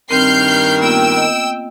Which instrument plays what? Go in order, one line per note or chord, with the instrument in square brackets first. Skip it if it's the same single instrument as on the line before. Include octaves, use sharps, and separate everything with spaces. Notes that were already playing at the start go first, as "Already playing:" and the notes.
[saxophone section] G2 D#3 A#4 [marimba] C4 [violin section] F6 G6 C7
[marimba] A#3 B3 F4 [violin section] G5 E6
[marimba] D#5